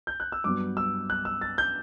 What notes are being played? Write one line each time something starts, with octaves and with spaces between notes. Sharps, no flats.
G6
F#6
E6
G2 F#3 B3 D6
E6
F#6
E6
A6
G6